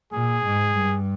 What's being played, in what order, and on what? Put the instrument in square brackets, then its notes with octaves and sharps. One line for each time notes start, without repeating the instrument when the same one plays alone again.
[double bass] A#2 [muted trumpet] G#4
[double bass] G#2
G2